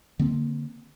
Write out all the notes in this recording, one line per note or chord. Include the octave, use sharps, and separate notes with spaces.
D3 A#3 C4